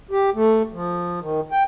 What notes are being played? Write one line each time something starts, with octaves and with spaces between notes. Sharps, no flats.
G4
A3
F3
D#3
G5